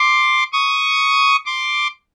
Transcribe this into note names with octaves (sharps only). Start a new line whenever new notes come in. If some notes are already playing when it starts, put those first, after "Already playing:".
Already playing: C6 D6
C#6 D#6
C6 D6